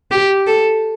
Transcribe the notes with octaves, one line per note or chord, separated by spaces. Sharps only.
G4
A4